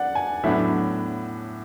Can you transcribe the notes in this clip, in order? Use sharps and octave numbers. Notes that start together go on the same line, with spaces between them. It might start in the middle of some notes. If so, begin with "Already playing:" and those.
Already playing: D5 F#5
G#5
A2 F#3 B3 D4 E5